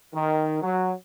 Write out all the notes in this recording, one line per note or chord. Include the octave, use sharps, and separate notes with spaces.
D#3
F#3